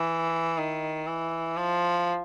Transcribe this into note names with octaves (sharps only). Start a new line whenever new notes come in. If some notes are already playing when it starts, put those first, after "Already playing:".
Already playing: E3
D#3
E3
F3